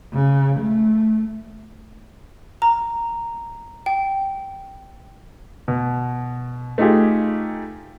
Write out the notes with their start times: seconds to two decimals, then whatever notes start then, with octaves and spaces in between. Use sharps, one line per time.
0.13 C#3
0.60 A3
2.62 A#5
3.86 G5
5.68 B2
6.78 A3 D#4 F4 G4 G#4